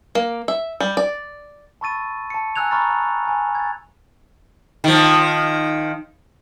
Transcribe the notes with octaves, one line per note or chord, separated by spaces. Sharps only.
A#3
E5
G3
D5
A5 B5 C#6 E6 A6 D#7
A5 C#7
G#5 A#5 E6 F#6 G#6 F7
A#5 B5 C#6 F6 A6
G#5
G#6 A6
D#3 F3